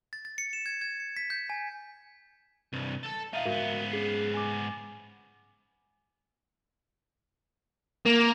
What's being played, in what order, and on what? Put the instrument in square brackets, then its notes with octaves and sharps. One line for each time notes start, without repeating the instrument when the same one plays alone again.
[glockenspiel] A6
A6
C#7
E7
G#6
G#6
C#7
B6
G6
G#5
[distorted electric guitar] C2 G2
A4 A5
[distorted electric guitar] D#4 F4 [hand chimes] E5 F5
[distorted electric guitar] G#2 B3 [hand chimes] F#4 A#4
[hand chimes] C#4 G#4 C7
G#5 D6
[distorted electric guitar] A#3